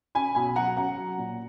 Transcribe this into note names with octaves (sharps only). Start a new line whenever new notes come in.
C#4 G#5 B5
B1 G#5 B5
F#3 F#5 A#5
C#4 F#5 A#5
F#3
A#2